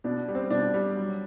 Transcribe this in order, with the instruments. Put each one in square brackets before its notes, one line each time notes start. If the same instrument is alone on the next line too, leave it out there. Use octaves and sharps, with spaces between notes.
[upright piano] B2 D4
G3
C4
B2 D4
G3
F#3